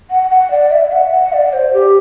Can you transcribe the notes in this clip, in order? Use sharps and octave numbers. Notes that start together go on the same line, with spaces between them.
F#5
F#5
D5
E5
F#5
F#5
D5
C5
G4